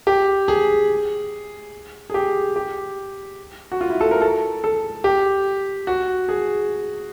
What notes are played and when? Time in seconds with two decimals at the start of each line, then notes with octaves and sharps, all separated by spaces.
0.07 G4
0.48 G#4
2.10 G#4
2.14 G4
2.56 G4
3.72 F#4
3.81 F4
3.90 E4
4.01 A4
4.11 A#4
4.22 A4
4.64 A4
5.04 G4
5.87 F#4
6.29 G#4